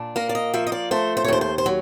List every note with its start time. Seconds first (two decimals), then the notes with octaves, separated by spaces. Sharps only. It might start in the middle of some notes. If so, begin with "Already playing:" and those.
Already playing: A#2 D4
0.16 A#3 A#4
0.29 D5
0.35 D#5
0.54 F3 E5
0.67 D#5
0.72 D5
0.91 A3 C5
1.17 C5
1.24 C#5
1.28 D#2 C5
1.41 C5
1.58 C5
1.66 F#3